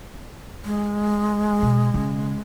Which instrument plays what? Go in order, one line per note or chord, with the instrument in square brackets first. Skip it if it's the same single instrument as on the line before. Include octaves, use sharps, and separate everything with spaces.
[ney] G#3
[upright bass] B2
C#3